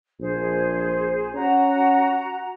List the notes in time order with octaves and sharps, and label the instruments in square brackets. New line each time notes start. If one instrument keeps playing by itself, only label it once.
[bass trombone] A#1 [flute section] G#4 C5
[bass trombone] C#4 [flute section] F#4 A#5